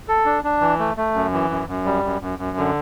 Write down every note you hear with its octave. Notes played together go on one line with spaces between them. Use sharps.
A4
D4
D4
E3
A3
A3
F#2
E3
F#2
F#2
G3
F#2
F#2
F#2
D3